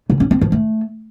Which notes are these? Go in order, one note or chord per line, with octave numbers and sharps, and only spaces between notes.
C#3
C#4
C4
F3
A3